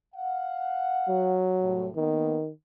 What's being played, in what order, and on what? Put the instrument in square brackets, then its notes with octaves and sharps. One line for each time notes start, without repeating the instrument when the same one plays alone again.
[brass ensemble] F5 F#5
[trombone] F#3
[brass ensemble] C2 A2
[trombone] D#3 [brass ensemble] A#3 B3